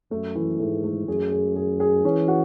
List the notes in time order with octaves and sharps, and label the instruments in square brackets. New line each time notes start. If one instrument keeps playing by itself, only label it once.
[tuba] F#2 [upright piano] A3
[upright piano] E3
[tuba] G#2 [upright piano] A3
[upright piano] A3
[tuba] F#2 [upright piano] G#4
[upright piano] G#4
G#4
G#4
[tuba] E3 [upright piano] C#4
[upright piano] F#4